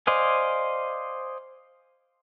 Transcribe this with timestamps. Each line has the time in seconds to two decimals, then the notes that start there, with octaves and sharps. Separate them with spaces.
0.07 C5 D5 D#5 F5 G#5